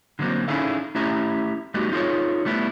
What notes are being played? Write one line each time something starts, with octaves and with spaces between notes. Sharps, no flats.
D3 F#3 G#3 A#3 C4
C#4 D#4 E4 G#4 A4 F5
A3 C#4 E4 G4 E5 A#5
G3 A3 B3 D#4 F#4 G4
D#4 F4 G#4 A#4 C#5
G3 A3 B3 E4